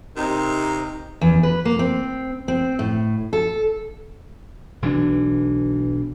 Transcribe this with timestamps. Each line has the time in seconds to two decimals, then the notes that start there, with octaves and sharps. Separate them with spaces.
0.16 C3 C4 D#4 A#4
1.21 E2
1.43 B4
1.65 A#3
1.79 C4
2.48 C4
2.79 A2
3.33 A4
4.82 B1 E3 G3 D4